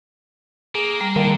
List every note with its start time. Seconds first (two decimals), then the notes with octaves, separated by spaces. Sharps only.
0.75 A#3 G#4
1.00 G3 A#5
1.16 D3 D#3 A#3